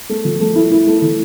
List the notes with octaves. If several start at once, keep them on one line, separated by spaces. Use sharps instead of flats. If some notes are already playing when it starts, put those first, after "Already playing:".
A3
F3
A3
E4
E4
A3
E3